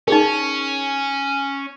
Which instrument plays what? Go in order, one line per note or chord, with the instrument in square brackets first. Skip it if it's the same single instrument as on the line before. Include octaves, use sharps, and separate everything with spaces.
[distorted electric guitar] C#4 [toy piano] D#4 G#4 A#4